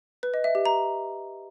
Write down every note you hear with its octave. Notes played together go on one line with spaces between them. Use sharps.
B4
D#5
E5
G4
A#5